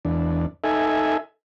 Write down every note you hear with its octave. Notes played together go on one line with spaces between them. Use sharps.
E2 D4
D#4 A4 E5 G#5